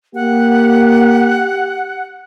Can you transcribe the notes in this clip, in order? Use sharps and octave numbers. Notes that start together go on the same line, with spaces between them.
A#3 G4 F#5